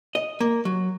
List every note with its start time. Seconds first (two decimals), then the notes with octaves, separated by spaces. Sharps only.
0.15 D#5
0.40 A#3
0.65 F#3